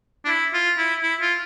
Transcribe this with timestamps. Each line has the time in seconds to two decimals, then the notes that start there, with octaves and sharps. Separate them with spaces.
0.25 D4
0.28 E4
0.54 F4
0.78 E4
1.03 E4
1.21 F4